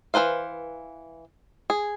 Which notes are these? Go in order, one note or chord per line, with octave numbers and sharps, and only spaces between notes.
E3 G#4 B4 C5 F5
G#4